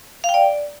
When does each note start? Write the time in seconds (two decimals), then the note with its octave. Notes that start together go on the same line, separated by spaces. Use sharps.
0.24 F5
0.29 G5
0.34 D5